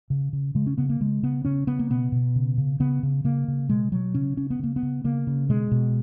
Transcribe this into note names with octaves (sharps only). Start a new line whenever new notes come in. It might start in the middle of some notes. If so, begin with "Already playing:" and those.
C#3
C#3
C#3 G#3
C#4
C#3 B3
A#3
C#3 G#3
C#3 B3
C#3 C#4
C#3 B3
A#3
B2 B3
B2
C#3
C#3
C#3 B3
C#3
C#3 A#3
C#3
B2 G#3
B2 F#3
C#3 C#4
C#3 C#4
B3
C#3 A#3
B3
C#3
C#3 A#3
C#3
B2 G#3
B2